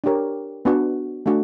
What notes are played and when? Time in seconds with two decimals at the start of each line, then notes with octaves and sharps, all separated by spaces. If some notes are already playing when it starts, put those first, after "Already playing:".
0.04 D4 G4 A#4 C#5
0.65 B3 D4 F#4
1.26 A3 D4 F#4